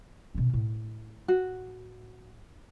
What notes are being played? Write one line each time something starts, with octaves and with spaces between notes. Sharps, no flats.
B2 C#4
A2
F#4